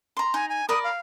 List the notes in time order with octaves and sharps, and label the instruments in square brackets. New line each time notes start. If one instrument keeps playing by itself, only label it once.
[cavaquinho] A#5 C6
[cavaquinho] D#4 [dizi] G#5
[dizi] G#5
[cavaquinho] A#4 D5 B5 [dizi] D#6
[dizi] F5